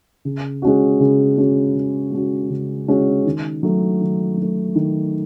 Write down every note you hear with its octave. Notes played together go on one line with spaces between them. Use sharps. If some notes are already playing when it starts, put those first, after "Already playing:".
C#3
G#3 C#4 F#4
C#3
G#3 C#4 F#4
C#3
G#3 C#4 F#4
C#3
G#3 C#4 F#4
D#3
F#3 A3
D#3
F#3 A3
D#3